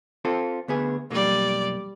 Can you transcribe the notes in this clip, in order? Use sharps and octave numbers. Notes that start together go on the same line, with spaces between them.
C4 F4 A4
D2 B3 G#4
B1 F2 G3 A#3 D5